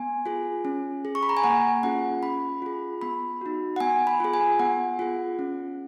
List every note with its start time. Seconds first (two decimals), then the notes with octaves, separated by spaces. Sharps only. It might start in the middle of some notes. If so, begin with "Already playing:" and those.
Already playing: B3 G#5
0.26 F4 G#4
0.65 C#4
1.05 G#4
1.15 C#6
1.23 B5
1.29 A#5
1.37 G#5
1.44 A#3 F#5
1.83 C#4 F4 G#4 F#5
2.23 C#4 B5
2.62 F4 G#4
3.02 B3 B5
3.41 D#4 F#4
3.76 F#5
3.80 B3 G#5
4.07 B5
4.20 F4 G#4
4.34 G#5
4.59 B3 F#5
4.99 F4 G#4
5.39 C#4